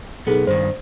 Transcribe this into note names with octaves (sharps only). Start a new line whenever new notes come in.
B1 B3 D#4 G#4 A4
G2 D#3 C5